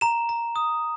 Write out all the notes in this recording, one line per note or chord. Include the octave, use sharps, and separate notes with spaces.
A#5 E7
A#5
D#6